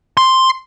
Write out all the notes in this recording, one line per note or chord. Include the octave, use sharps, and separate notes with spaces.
C6